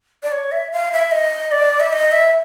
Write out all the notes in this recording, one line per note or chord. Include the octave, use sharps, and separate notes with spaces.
D5
C#5
E5
F5
E5
D#5
D5
E5
D#5
E5